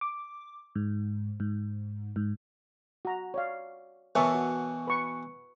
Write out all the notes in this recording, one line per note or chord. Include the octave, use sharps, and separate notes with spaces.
D6
G#2
G#2
G#2
F#4 A#5
C#5 D5 F5
B2 E3 A#4 C#5 E5 A5
F#4
B4 C#6